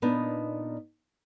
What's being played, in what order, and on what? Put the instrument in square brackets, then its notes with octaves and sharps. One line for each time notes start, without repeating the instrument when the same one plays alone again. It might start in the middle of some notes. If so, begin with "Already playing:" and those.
[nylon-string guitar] A#2 B3 D4 D#4